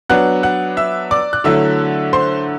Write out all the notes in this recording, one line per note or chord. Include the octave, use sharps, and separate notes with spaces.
F#3 B3 D4 F#5 F#6
F#5 F#6
E5 E6
D5 D6
F#6
D3 F#3 A3 E4 E5 E6
C5 C6